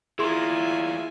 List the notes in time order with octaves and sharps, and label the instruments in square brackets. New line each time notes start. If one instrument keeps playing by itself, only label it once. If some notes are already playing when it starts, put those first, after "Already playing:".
[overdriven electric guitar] E2 A#3 [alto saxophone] E4 [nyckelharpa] F4 G#5 [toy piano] G#4 C6